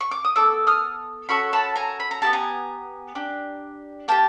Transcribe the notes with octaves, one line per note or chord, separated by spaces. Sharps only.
C#6
D6
D#6
B3 E4 A4 D6 E6
D#6 F6
C#4 F#4 A4 B5 C#6
A5 B5
G#5 A#5
B5
A#5
B3 E4 G4 A5
G#5 A#5
D4 G4
A#3 D4 G4 G5 A5